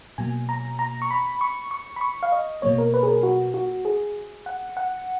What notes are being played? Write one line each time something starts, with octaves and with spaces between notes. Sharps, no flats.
B2 F#3 A#3 G#5
A#5
A#5
C#6
B5
C#6
C#6
B5
C#6
F5
D#5
B2 F#3 A#3 C#5
A#4
B4
G#4
A#4
F#4
F#4
G#4
F#5
F#5